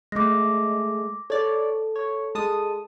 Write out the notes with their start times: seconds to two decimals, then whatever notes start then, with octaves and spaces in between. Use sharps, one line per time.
0.12 G#3 A3 D6 A#6
1.30 A4 C#5 D5
1.96 C#5
2.35 G#3 A5 D#6